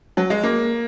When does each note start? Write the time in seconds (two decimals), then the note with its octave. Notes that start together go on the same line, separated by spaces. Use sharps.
0.17 F#3
0.30 G#3
0.44 A#3